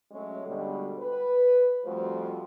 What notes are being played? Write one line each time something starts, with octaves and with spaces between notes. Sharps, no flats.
F#3 G#3 A3 C#4 C#5
B2 D3 G3 G#3 F#4 D#5
B4
F2 F3 G3 A3 F#4 C5